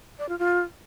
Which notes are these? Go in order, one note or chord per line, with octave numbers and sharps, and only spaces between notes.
D5
F4
F4